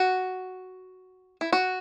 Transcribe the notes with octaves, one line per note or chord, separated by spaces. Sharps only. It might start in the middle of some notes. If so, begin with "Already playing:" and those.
Already playing: F#4
E4
F#4